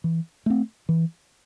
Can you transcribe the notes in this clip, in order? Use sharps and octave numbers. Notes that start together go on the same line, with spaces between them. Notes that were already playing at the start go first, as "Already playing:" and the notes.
E3
A3 C4
E3